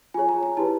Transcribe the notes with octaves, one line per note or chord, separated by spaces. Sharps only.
F4 G#4 C#5 G#5
A#5
A#5
E4 G4 B4 A5